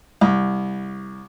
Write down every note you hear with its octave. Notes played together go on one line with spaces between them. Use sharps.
C2